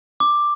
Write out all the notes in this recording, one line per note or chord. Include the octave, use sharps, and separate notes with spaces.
D6